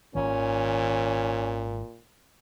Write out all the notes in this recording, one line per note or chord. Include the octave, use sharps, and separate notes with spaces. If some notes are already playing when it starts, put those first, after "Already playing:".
G#1 A#2 D#3 C#4